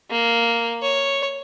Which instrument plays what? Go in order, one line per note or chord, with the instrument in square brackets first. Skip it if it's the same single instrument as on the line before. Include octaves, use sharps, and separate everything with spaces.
[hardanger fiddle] A#3
C#5